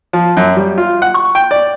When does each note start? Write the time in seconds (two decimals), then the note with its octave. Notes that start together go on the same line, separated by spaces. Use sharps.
0.13 F3
0.37 F#2
0.57 G3
0.78 F4
1.02 F#5
1.14 C#6
1.35 G5
1.51 D5